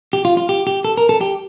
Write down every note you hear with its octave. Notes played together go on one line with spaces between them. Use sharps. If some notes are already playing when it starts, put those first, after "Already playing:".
G4
F4
F4
G4
G4
A4
A#4
A4
G4